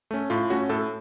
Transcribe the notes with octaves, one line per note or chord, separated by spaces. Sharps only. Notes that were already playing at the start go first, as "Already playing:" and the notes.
A3 C#4
A2 F4
A3 C#4 F#4
A2 A4